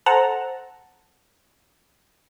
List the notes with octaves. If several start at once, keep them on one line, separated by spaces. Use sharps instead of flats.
A4 C5 F#5 A5 A#5